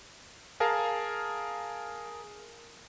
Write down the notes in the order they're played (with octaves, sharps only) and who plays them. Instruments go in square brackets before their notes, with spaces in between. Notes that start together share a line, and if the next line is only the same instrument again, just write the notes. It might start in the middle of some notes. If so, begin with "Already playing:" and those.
[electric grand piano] G#4 A#4 F5 A5